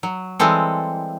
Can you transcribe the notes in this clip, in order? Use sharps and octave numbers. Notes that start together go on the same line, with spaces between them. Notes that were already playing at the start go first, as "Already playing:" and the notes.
F#3
E3 G3 G#3 C4 A4